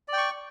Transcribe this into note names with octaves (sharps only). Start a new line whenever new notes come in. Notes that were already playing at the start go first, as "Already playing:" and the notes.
D5 G5 C#6